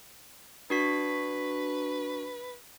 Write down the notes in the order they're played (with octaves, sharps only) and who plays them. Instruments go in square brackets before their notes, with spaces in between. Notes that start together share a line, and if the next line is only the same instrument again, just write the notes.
[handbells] D4 F#4 B6 [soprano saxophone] B4